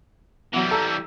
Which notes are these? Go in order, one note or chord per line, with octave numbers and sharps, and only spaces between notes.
E3 F#3 G3 B3
A4 A#5 E6